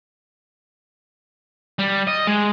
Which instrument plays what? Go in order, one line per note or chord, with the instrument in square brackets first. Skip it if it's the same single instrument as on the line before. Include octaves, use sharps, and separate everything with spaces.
[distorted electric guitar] G3
D#5
G#3